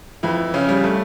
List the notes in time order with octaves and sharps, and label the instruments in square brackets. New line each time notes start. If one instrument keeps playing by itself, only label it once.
[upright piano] F2 E3 E4
C#3 C#4
G3
A3